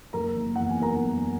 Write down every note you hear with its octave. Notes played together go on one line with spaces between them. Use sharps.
F#1 A#4 A#5
F#1
E2 F#5
G#5
B2 A#4 A#5
F#1